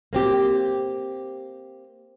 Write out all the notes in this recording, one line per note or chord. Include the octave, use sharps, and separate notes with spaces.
A#3 C4 G4